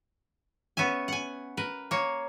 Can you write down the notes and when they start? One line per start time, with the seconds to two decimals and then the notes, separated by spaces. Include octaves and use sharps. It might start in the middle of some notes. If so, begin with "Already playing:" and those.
0.77 B3 C#4 E5 G#5
1.08 F#5 G#5
1.57 A#4 B4
1.91 A#3 C#5